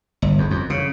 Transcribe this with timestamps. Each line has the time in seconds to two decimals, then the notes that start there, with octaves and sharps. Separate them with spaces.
0.22 G1
0.38 E2
0.51 F2
0.70 C#3